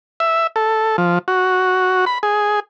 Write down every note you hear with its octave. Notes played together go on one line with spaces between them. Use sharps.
E5
A4
F3
F#4
B5
G#4